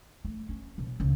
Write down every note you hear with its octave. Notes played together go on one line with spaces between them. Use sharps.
A3
C#4
F#2 B2
C#2